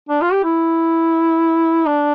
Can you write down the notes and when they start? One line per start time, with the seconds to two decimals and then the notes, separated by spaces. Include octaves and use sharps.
0.09 D4
0.21 F4
0.32 G4
0.44 E4
1.86 D4